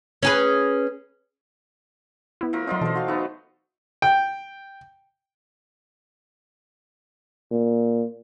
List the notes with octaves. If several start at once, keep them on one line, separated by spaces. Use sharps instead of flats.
C#4 G#4 B4
B3 E4
F3 A3 A#4
F#3 C4 D#4 F4 A#4 D5 C6
B2 E3 F#3 A4 C5
F#4 F5
A3 B3 D#4
G5
A#2